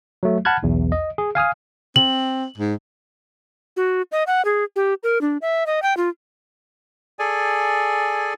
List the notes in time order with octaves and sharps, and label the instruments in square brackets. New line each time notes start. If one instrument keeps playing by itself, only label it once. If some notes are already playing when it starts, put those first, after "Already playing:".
[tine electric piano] F#3 A3
F#5 A5 B5 F6 F#6 G#6
B1 E2
D#5
G#4
F5 G#5 D#6 F6
[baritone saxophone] C4 [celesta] F#7
[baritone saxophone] G#2
[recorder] F#4
D#5
F#5
G#4
G4
A#4
D4
E5
D#5
G5
F4
[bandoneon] G#4 A4 D5 G#5